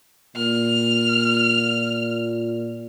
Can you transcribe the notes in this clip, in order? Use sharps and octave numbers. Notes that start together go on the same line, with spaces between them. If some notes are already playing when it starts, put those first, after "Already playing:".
A#2 F6